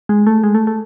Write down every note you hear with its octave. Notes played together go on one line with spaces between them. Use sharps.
G#3
A3
G#3
A3
A3